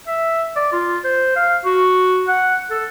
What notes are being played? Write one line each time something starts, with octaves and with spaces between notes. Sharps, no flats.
E5
D5
F4
C5
F5
F#4
F#5
A4